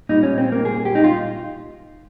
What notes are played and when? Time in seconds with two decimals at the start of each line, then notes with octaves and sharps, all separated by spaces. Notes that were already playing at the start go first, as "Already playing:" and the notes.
0.09 A#2 G3 D#4
0.23 C#4
0.38 C4
0.52 A#3
0.65 G#4
0.85 G4
0.95 D#4
1.04 F4